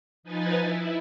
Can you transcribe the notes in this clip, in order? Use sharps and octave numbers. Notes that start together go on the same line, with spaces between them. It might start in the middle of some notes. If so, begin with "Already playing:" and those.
F3 D#4 B4 G#5 A6
E4